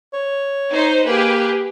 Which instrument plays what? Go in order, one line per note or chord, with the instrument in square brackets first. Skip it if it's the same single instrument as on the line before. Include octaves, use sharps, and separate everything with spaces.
[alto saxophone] C#5
[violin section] D#4 C5
[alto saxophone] A#3 [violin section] G4 G#4 B4